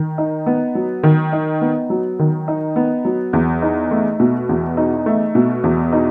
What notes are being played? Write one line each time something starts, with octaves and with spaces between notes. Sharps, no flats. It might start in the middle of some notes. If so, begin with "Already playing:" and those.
Already playing: D#3
D#4
B3
F#3
D#3
D#4
B3
F#3
D#3
D#4
B3
F#3
E2
D#4
A3
B2
E2
D#4
A3
B2
E2
D#4